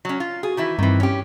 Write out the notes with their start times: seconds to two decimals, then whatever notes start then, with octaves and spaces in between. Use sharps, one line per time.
0.05 F#3 C#4
0.20 F4
0.43 F#4 G#4
0.57 D#3 E3 E4
0.79 G2 D#3 E3 C4
1.00 C#4 G4